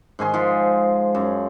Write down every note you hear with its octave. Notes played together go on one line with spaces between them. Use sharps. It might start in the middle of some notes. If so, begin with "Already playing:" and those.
G#2 D#3 G#4 C6
G#2 F3
F#2